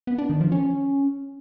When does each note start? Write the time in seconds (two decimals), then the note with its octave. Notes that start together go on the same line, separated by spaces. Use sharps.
0.07 B3
0.18 D4
0.30 D#3
0.41 F3
0.52 C#4